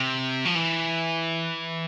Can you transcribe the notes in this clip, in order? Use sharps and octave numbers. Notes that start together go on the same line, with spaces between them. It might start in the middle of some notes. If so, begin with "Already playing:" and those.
Already playing: C3
F3
E3